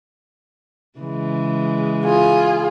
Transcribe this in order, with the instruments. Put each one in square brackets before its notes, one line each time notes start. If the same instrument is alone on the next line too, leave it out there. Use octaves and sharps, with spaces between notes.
[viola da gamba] C#3 E3 G#3
[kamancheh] F4 G#4